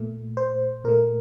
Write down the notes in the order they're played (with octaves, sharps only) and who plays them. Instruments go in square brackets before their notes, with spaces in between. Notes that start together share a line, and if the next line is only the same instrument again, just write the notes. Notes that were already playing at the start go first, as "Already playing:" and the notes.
Already playing: [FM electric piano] A#2 A3
C5
A#2 A3 A#4